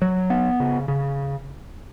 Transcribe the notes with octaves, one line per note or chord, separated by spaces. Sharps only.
F#3
B3
C#3
C#3